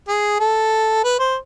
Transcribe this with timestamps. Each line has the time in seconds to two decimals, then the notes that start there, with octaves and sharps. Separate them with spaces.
0.08 G#4
0.40 A4
1.04 B4
1.20 C5